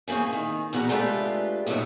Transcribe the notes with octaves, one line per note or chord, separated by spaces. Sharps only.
E3 A#3 C4 G#4 C#5
D#3
E2 G3 F#4 F#5 A#5
G#3 A3 D4 F4 G4 B4
D#2 C3 F#3 B3 D#4 E5